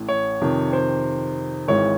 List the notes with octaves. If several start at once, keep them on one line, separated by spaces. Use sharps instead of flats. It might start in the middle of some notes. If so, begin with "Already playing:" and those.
Already playing: A1 A2 E3
C#5
F2 C3 D#3
C5
G#1 G#2 E3 G#3 C#5